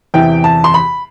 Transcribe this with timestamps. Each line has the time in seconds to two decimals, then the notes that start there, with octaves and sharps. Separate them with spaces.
0.14 E2 C3 E3 G5
0.44 A5
0.64 C6
0.74 B5